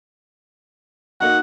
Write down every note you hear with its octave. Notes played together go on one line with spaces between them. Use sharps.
A#3 D#4 F#4 F#5